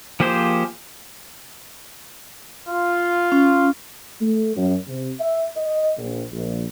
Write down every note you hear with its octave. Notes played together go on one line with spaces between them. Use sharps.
F3 A#3 G4 G#4 C5
F4
C#4
A3
F#2
C3
E5
D#5
A#1
A#1